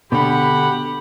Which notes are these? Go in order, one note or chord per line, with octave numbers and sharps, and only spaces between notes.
B2 D3 G4 F#5 B5